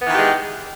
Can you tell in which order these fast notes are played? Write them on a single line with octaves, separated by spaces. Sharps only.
B3 E3 D#3 G4 G#3